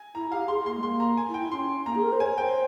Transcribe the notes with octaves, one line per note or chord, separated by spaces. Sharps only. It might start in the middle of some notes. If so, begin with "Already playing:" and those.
Already playing: G#5
E4 A#5
G4 F5
G#4 C6
A#3 C6
G#3
A#3 C6
A#5
G#5
E4
G5
E4
C#4 C6
A#3 A#5
G#4
A#4
C5
C#5 G#5
C5 G5